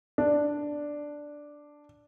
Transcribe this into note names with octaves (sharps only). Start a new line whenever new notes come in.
D4